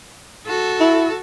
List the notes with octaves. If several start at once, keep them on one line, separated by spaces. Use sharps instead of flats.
F#4 A4
E4